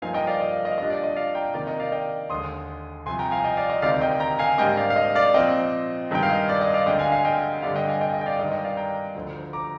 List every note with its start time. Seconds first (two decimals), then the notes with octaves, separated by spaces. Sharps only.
0.02 G2 F3 A#3 D#4 F5 G#5
0.14 D#5 G5
0.27 D5 F5
0.40 D#5
0.52 F5
0.65 D#5
0.71 F5
0.78 A#2 G3 D4 D#5
0.90 D5
1.03 D#5
1.15 D5 F5
1.35 G5 A#5
1.54 C3 D#3 A#3 D5 F5
1.67 D#5
1.80 D5 F5
1.92 D#5 G5
2.30 D#2 D3 G#3 C6 D#6
3.06 C2 C3 F3 G#5 C6
3.19 G5 A#5
3.31 F5 G#5
3.44 D#5 G5
3.57 D5 F5
3.70 D#5
3.82 D2 C3 D#3 G#3 D5 F5
4.01 D#5 G5
4.20 G5 A#5
4.39 F5 G#5
4.58 G#2 G3 A#3 D4 D#5 G5
4.77 D5 F5
4.90 F5
4.96 D#5
5.15 D5 F5
5.34 A#2 F3 C4 D#5 G5
6.11 G2 D#3 G#3 G5
6.23 F5
6.29 D#5
6.49 D5
6.61 D#5
6.74 D5 F5
6.86 D2 D3 G#3 D4 D#5 G5
6.99 F5 G#5
7.12 F5 G#5
7.25 D#5 G5
7.62 G2 D3 G3 D5 F5
7.75 D#5 G5
7.88 F5 G#5
8.01 D#5 G5
8.14 D#5
8.21 G5
8.26 D5 F5
8.39 G2 D#3 G#3 D#4 D#5
8.52 D#5 G5
8.64 D5 F5
8.77 G5 A#5
9.15 D2 D3 F3
9.53 A#5 D6